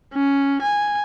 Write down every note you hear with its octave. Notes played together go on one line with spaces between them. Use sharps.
C#4
G#5